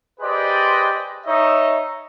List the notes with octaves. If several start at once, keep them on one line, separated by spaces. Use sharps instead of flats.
G4 G#4 B4 C5 D5 D#5
D#4 C#5 D#5 E5